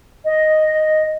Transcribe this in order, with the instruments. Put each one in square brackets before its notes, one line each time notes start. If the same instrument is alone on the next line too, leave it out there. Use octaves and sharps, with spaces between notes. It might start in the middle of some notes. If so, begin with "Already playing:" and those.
[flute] D#5